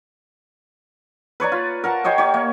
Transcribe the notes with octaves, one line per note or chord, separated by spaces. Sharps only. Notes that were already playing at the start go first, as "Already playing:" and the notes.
B4 C#5 D5 A#5
F4
A#4 F#5 A5
G4 C5 C#5 D#5
G4 C#5
A#3